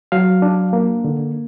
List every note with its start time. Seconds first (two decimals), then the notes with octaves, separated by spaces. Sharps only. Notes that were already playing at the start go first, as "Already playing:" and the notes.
0.12 F#3 F5
0.42 D4
0.73 A#3
1.04 D3